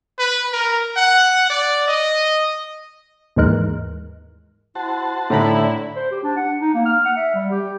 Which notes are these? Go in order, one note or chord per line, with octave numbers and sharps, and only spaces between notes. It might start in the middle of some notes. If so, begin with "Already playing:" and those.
B4
A#4
F#5
D5
D#5
D#2 G#2 E3 G#3 A#4 F#6
E4 F#4 C5 A5
A2 D3 E4 A#5 B5
C5
G4
D4
F#5
D#4
A#3
F6
F#5
E5
G3
G4